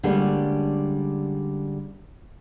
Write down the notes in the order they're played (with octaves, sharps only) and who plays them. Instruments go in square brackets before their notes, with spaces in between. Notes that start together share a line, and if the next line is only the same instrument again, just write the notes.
[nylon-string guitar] D3 G3 G#3 A#3 C#4 D4